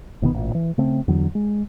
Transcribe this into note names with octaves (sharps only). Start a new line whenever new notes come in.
D1 B2 D#3 B3
A1 A#2
E3
C#3 A3 C4
E2 D3 F#3
G#3